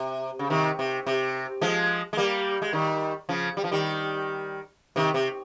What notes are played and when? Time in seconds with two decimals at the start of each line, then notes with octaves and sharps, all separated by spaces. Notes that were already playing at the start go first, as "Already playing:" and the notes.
Already playing: C3
0.39 C#3
0.50 C3 D#3
0.79 C3
1.07 C3
1.61 F3 G#3
2.13 G#3
2.17 G3 A#3
2.62 G#3
2.73 D#3 G3
3.29 C#3 F3
3.57 G3
3.64 F3
3.71 D#3 G3
4.96 C3 D#3
5.14 C3